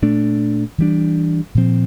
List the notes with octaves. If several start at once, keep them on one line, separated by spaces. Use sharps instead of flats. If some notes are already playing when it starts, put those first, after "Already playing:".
A#2 A3 D4
E3 G3 D4
A#2 F3 C4